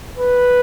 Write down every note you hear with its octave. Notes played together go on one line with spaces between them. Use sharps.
B4